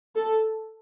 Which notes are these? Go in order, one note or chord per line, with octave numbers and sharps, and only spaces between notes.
A4